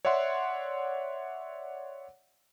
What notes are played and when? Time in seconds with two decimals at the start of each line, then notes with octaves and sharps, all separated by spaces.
0.05 C#5 D5 E5 F#5 C6